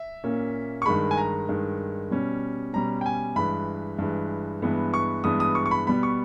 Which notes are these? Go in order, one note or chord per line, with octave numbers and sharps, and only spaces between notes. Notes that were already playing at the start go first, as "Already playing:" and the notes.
Already playing: E5
A#2 A#3 C#4
C#6
G2 D#3 G#3 B5
G#5
A#5
G2 D#3 G#3
B2 G3 C#4
B2 G3 C#4 A#5
G5
G#5
G2 E3 G#3 B5
G2 E3 G#3
G2 E3 G#3 B3
C#6
G2 E3 G#3 B3 D#6
D#6
C#6
C#6
B5
B2 G3 B3 B5
C#6